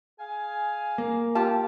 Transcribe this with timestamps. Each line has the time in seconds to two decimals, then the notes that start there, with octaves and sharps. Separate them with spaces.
0.19 G#4 F5 G#5
0.98 A#3
1.35 F4 G4 A5